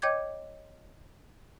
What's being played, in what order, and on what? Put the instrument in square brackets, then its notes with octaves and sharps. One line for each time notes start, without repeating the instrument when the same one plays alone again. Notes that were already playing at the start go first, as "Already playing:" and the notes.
[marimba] C#5 D#5 G5 D6 G6 G#6